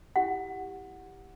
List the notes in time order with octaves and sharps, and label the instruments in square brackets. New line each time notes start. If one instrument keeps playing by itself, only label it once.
[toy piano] E4 G4 F#5